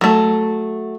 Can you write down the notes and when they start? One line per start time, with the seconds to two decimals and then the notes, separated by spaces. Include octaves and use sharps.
0.01 F#3 A3